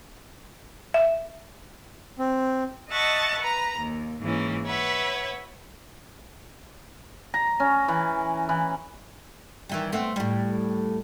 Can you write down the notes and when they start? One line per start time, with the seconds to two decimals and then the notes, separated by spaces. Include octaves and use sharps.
0.94 E5
2.19 C4
2.91 D#5 E5 F#5 A5 C#6
3.40 B4 A#5
3.78 D#2
4.22 G#2 E3 A#3 C#4
4.65 B4 C#5 E5 F#5
7.34 A#5
7.60 C#4
7.88 E3
8.49 E3
9.69 D#3 E3 G3
9.92 A3 B3 C4
10.16 A2 G3